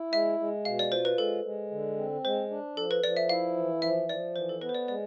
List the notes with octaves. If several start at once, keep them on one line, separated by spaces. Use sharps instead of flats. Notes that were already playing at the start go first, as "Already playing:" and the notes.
Already playing: E4
G#3 E5
G#3
B2 F5
D5
F4 C5
B4
G#3 A4
G#3
D3
C4
G#3 C5
D4
F3 A4
B4
F3 D5
E5
E4 F5
E3
F3 E5
F3 D5
E3 C5
A4
B3 B4
C5
D5
G#3 D5